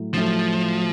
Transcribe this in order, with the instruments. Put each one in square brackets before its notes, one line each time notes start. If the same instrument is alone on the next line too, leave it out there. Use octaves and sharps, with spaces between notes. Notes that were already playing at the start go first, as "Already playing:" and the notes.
Already playing: [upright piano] A2 F#3 A3
[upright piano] A2 F#3 A3 [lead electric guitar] F3